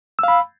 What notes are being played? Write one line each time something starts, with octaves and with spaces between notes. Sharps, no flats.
F5 B5 E6